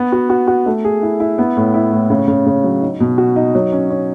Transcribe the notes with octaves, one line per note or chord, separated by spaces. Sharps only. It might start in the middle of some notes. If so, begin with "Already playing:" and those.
Already playing: B3
F#4
F#4
F#4
A3
G#4
E4
E4
B3
A2
E4
A2
C#3
C#3
C#3
F#3
D#4
B2
F#4
D#4
F#3
C#4
C#4